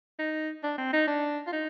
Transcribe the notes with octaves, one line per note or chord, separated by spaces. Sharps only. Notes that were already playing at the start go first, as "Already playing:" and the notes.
D#4
D4
C4
D#4
D4
F4
D#4